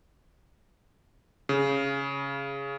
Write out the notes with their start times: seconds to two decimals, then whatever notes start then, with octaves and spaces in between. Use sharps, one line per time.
1.49 C#3